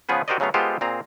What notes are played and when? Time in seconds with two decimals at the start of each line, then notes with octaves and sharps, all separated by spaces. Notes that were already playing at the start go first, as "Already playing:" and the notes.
0.09 C#3 F3 B3 G#4 B4
0.28 F#4 G4 A#4 C5 D5 D#5
0.40 C#3 F#3 A3 B3 F5
0.54 G#3 B3 F4 G4 A4 C5
0.81 A#2 C4 G#4 A#5